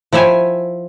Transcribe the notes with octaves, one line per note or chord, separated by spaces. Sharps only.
F3 E4 C#5 E5 G5 G#5